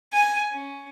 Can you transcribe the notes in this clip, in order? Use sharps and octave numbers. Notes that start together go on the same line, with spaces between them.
G#5
C#4